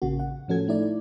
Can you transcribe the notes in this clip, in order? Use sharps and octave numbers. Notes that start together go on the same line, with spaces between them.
A1 C#3 A#3 F#4
F#5
A2 F3 C#4 F#4 A4 G#6
A3 D#4 E4 D5